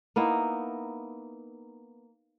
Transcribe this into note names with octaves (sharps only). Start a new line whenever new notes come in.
A#3 B3 D#4 E4